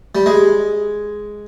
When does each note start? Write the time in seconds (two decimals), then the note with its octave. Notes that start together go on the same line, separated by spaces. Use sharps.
0.15 G3
0.26 G#3